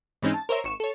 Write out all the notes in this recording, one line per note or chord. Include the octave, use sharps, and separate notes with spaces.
G#2 E3 G#3 C4 C#4 D#4
A5
A#4 C5 C#5 E5 A#5
G#1 C#6 E7
A4 C#5